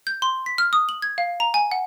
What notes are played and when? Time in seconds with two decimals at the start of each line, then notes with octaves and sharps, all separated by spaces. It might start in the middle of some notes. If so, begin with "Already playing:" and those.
0.07 G6
0.22 C6
0.46 B6
0.58 F6
0.73 D#6
0.89 F#7
1.02 G#6
1.18 F5
1.40 A#5
1.54 G#5
1.71 F#5